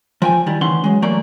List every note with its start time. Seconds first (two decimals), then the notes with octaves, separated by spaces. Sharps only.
0.22 F3 G5 G#5
0.46 D#3 G3 E4
0.61 D2 D#3 E3 C#4 F#5 C6
0.84 F#3 G#3
1.02 E3 F#3 A3 A#3 D5